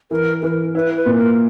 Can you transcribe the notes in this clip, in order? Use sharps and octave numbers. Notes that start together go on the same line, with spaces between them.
E3 A#4
E3 A#4 B4
E4 B4
B4
A#2
A#4